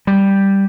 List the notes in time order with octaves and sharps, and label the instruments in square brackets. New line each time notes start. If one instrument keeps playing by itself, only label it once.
[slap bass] G3